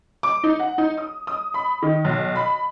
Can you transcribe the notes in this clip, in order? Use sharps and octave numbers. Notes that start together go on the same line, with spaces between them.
D6
D#4
F#5
D#4
D#6
D#6
B5
D#3
B1
B5